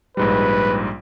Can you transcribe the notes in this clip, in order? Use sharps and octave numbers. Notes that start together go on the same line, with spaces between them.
A#1 G#2 G3 B4